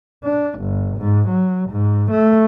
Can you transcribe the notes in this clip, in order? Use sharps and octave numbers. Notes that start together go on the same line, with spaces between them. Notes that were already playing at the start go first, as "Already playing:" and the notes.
D4
G1
G#2
F#3
G#2
A3